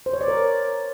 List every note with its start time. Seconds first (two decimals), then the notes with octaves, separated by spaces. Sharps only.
0.06 C5
0.13 C#5
0.21 D5
0.28 A#4